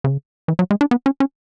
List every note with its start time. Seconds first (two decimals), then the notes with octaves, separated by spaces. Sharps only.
0.04 C#3
0.48 E3
0.59 F#3
0.71 G#3
0.81 D4
0.91 B3
1.06 C#4
1.20 C#4